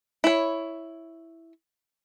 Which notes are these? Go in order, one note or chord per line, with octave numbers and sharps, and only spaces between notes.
E4 C#5